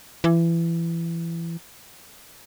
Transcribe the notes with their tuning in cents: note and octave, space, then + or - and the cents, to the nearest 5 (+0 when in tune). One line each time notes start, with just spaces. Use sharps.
E3 +25